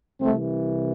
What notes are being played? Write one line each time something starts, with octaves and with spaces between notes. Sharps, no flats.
C2 C3 E3 A3 C4